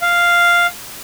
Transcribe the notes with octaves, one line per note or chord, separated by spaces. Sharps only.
F5